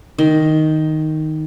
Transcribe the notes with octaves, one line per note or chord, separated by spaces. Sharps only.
D#3